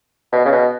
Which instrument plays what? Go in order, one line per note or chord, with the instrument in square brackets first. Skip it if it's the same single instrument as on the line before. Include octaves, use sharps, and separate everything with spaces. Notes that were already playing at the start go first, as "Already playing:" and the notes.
[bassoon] B2
C#3
B2